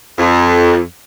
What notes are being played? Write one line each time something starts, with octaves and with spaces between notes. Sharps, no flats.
F2